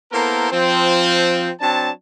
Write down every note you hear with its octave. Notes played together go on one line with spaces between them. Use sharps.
A#3 B3 E4 A4 A#4 C5
F3 C4
F#3 C4 D4 A5